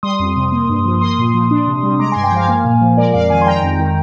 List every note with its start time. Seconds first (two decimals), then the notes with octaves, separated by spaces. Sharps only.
0.03 G3 C6 D#6
0.19 F2
0.36 C3
0.52 A#3
0.69 G2
0.85 F3
1.01 A#3 C6 D#6
1.18 A#2
1.34 F3
1.51 D4
1.67 C3
1.83 G3
1.99 G#3 A#5 D6
2.12 G2 G#5 C6
2.23 G5 A#5
2.32 F3 F5 G#5
2.48 A#3
2.65 A#2
2.81 F3
2.97 G#3 A#4 D5
3.14 F2 D5 F5
3.30 D#3 F5 G#5
3.41 C6
3.47 G#3 G5 A#5
3.63 F2
3.79 D#3